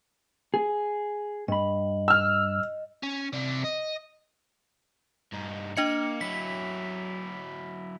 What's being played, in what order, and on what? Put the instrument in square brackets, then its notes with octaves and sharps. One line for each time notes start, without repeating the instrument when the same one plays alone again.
[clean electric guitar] G#4
[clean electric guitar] G2 B5 [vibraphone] D#5
[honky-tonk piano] E6 F6
[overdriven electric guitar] C#4
C3 D5
D#5
G2 D#4
[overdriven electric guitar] A#3 [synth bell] D4 D#5 C#7
[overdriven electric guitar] F#3 E4 [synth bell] B6